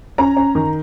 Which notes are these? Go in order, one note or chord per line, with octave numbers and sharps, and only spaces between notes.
C#4 A#5
C#4
D#3